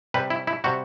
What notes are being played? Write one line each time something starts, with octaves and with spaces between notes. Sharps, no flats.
C3 G3 B4
E4
E4
C3 G3 F#4